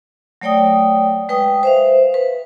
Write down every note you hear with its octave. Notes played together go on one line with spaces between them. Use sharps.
F#3 A3 C#5 D5 G5 D#6
G#3 B4 G5 D#6
C5 E5 F5
B4